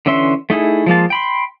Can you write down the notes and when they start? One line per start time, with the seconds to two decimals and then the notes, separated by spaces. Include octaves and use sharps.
0.06 D3 E3 C#4 E5 C6
0.50 A3 D#4 E4 G#4
0.86 F3 G#3 A#3 A5
1.10 G5 B5 C6